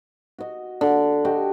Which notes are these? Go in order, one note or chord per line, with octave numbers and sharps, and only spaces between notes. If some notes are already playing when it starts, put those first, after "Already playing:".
F#4 D#5
D3
F#4 G4 D#5